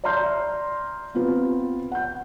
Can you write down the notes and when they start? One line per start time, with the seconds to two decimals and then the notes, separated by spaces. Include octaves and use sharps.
0.04 D5 E5 A#5 C6 F6 G6
1.15 B3 C4 F4 B4
1.92 F#5 G6